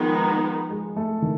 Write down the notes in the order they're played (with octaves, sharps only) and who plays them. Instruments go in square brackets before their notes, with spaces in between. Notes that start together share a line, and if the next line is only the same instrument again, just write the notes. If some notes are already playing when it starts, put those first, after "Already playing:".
Already playing: [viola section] D#3 G#3 B3 D#4 [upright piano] F3
[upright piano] G#3
A3
D#3